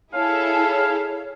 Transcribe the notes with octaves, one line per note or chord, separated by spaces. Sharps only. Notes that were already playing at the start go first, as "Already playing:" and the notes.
E4 G#4 A4 C#5 F5